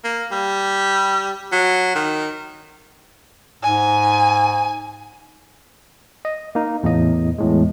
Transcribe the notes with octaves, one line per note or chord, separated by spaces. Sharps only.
A#3
G3
F#3
D#3
G#2 G#5
D#5
A#3 D#4
E2 A2 D#5
E2 A2 G#3